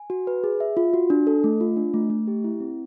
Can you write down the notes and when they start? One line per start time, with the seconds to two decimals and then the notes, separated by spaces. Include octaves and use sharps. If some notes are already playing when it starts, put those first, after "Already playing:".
Already playing: G#5
0.10 F#4
0.27 B4
0.44 G#4
0.60 E5
0.77 F4
0.94 F#4
1.10 D4
1.27 A4
1.44 A3
1.61 F4
1.76 D4
1.94 A3
2.10 A3
2.28 G4
2.44 E4
2.60 C4